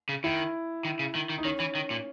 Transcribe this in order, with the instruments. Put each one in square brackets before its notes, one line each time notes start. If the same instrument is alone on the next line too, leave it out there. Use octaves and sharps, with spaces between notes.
[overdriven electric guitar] C#3
[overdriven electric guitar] D#3 [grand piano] E4
[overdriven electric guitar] D#3
C#3
D#3
D#3
[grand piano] D#4
[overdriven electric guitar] D#3 [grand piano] C#4
[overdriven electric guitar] E3
D#3
A#2